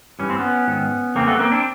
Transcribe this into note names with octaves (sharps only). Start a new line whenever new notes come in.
G2 E3 C#4
C4
B3 C#4
G#2 D#3
E2 C#3 A#3 C4
A3 B3
A#3 C4
C4 D4